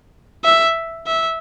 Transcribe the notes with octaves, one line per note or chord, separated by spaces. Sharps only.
E5
E5